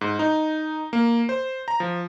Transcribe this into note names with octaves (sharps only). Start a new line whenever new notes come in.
G#2
D#4
A#3
C5
A#5
F3